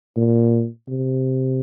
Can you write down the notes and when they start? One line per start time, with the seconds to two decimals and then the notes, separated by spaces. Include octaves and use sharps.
0.17 A#2
0.88 C3